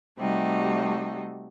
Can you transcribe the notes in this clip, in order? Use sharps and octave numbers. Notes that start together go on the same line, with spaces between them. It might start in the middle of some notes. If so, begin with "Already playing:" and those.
C3 G3 A3 D#4 F#4